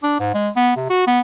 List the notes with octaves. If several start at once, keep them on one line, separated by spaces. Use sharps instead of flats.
D4
G#2
G#3
B3
C3
F#4
B3